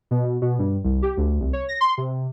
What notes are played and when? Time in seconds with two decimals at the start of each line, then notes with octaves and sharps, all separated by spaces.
0.11 B2
0.25 B2
0.42 B2
0.59 G2
0.84 C2
1.02 G4
1.17 D2
1.41 C2
1.53 C#5
1.69 A#6
1.81 C6
1.98 C3